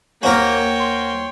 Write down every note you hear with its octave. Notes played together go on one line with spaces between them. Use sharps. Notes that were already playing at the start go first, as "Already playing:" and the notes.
D#2 A#3 F#4 A#4 C5 C#5 G5 G#5
C6